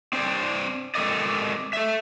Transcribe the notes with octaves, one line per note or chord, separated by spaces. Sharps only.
C4 D4 C5 D5
G#3 C4 A4 A#4 D5 D#5
A4 E5